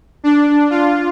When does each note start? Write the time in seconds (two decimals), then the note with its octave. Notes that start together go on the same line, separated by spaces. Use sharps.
0.24 D4
0.70 F4